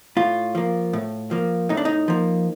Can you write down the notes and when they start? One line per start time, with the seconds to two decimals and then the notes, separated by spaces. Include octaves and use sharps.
0.17 A2 F4
0.55 F3 A#3
0.93 A2
1.31 F3 A#3
1.69 A2 D#4
1.77 D4
1.85 D#4
2.08 F3 A#3